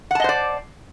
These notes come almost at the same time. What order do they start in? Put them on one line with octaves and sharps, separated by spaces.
F#5 A5 D#5 C5 D5